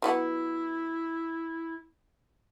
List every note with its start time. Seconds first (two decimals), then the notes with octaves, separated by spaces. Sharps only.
0.02 F#3 B3 E4 F#5